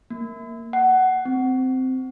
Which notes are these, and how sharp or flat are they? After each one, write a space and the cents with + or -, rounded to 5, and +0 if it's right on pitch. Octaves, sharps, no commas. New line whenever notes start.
A#3 -5
F#5 +15
C4 -10